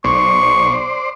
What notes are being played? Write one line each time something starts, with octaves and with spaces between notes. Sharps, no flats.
B1 C5 D5 C#6